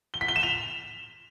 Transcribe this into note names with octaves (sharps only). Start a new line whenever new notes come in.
G7
B6
G7
E7
F7